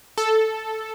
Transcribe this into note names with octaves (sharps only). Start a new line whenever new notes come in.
A4